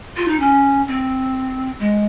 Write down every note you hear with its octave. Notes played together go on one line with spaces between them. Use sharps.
F4
D#4
C#4
C4
G#3